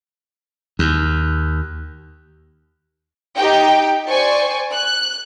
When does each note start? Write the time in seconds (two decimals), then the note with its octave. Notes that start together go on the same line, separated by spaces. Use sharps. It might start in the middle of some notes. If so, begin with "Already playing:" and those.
0.79 D#2
3.37 D#4 G4 G5
4.08 C5 D5 G#5 C#6
4.74 F#6